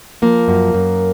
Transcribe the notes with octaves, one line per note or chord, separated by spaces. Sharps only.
F3 A#3
F#2
F#2